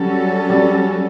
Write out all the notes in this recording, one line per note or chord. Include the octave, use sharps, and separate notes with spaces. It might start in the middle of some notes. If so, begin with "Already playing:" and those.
Already playing: F#3 G3 C#4 F#4 A4
G3